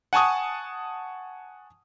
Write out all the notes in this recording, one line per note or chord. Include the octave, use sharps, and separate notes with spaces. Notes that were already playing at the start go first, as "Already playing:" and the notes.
F#5 G#5 A5 C#6 D#6